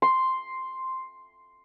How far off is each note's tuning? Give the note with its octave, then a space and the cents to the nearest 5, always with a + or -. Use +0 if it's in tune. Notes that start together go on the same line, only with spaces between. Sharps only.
C6 +0